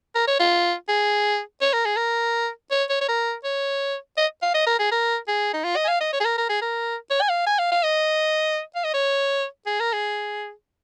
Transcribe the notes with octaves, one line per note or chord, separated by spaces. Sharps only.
A#4
C#5
F4
G#4
C#5
A#4
G#4
A#4
C#5
C#5
C#5
A#4
C#5
D#5
F5
D#5
A#4
G#4
A#4
G#4
D#4
F4
D#5
G#5
F5
D#5
C#5
G#4
A#4
A#4
G#4
A#4
C#5
G#5
F5
G#5
F5
F5
D#5
F5
D#5
C#5
G#4
A#4
G#4